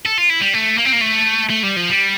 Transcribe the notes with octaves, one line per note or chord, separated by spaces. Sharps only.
A4
F4
E4
G3
A3
A#3
C4
A#3
A3
A3
G3
F3
G3